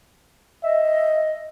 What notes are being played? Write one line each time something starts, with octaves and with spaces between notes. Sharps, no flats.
D#5 E5